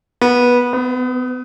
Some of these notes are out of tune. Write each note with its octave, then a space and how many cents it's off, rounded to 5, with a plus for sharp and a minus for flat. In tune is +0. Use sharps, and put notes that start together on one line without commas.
B3 -15
B3 +35